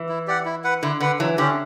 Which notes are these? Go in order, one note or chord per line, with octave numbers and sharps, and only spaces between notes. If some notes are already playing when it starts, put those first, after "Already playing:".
Already playing: E3
E4
G4 D5 F#5
E4
B4 F#5
D3 E4
D3 B4 F#5
E3 F#3
D3 C#4 G4